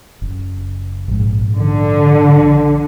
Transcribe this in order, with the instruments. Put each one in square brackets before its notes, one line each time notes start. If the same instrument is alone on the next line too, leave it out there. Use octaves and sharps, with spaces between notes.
[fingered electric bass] F#1
A#1 G#2
[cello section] D3